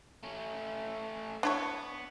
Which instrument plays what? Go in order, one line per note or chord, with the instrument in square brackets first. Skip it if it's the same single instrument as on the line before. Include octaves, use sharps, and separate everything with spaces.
[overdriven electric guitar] A3 C#4
[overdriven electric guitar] B3 [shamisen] D4 E4 C#5